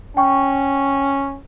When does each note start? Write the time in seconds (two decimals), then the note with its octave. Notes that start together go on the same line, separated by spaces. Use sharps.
0.17 C#4 G5 C#6